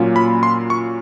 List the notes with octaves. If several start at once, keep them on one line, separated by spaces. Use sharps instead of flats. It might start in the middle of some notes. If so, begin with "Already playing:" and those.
Already playing: A#2 F#3 A#3 C#4 F4
B5
C6
C#6